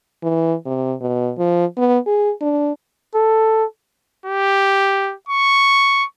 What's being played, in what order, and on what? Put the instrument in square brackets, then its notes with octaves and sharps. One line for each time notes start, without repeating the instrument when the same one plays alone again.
[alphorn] E3
C3
B2
F3
B3
G#4
D4
[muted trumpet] A4
[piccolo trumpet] G4
C#6